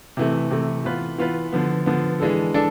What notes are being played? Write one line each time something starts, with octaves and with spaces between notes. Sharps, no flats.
C3 E3 A3
C3 E3 A3
E3 B3 F4 B4
E3 B3 F4 B4
D3 F3 B3
D3 F3 B3
E3 G#3 D4 A4
D4 A4